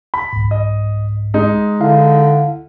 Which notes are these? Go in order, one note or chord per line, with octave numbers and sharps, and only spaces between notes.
B5
C2 G#2
D#5
G#3 D#4
D3 E4 E5 F5